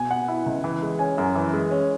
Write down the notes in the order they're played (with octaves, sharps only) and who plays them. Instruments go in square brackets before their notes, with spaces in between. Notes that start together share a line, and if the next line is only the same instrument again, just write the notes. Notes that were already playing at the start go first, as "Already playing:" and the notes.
Already playing: [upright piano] B2 [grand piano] G#5
[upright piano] B3 [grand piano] F#5
[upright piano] E4
C#2
E3
G#3
[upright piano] C#4 [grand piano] G#5
[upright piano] F#2
[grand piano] G#5
[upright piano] E3
G#3
C#4